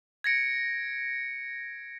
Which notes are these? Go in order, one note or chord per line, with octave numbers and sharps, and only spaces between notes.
G#6 A#6 C#7 D7